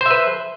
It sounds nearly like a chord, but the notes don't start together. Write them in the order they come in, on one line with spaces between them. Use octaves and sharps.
C5 E5 B4